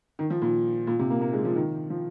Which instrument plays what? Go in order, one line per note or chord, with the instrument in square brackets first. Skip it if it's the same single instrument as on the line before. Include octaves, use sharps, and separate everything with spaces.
[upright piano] D#3
F3
A#2
A#2
C3
A#3
A#3
G#3
F3
D#3
F3